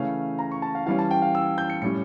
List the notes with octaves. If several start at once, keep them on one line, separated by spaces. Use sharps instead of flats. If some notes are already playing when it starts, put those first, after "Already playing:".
Already playing: C#3 E3 A3 C#4 F5
A#5
C#6
A5
F5
E3 G3 C#4 F5
A5
G5
F5
E6
G6
C#7
A2 G3 C#4 C#7